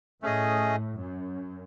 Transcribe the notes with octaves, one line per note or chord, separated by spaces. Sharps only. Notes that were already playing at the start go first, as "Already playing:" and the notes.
A2 A3 C#4 G#4 D#5
F#2